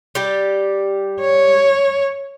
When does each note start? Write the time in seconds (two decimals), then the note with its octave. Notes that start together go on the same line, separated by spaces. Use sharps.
0.15 G3 G4
1.21 C#5